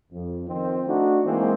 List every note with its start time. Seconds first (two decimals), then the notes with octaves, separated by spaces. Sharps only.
0.12 F2
0.48 D#3 F3 C4 C5
0.87 A3 D4 D#4 F#4
1.25 E3 G#3 A#3 C4